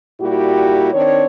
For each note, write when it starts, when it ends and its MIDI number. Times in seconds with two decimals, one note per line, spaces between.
0.21 0.90 46
0.21 0.90 55
0.21 0.90 64
0.21 0.90 66
0.21 0.90 67
0.94 1.26 51
0.94 1.26 60
0.94 1.26 62
0.94 1.26 73